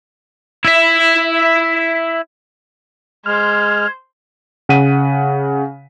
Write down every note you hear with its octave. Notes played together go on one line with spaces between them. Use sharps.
E4 E5
G#3 C5 F6 G#6
C#3 F#5 B6 D#7